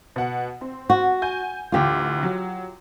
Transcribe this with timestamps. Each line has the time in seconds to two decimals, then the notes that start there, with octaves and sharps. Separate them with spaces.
0.16 B2 F#5
0.61 C4
0.90 F#4
1.22 G#5 G6
1.72 A1 D2 F4 G4
2.23 F#3